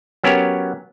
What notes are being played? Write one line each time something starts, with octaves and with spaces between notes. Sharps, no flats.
F#3 B3 C#4 G4 A#4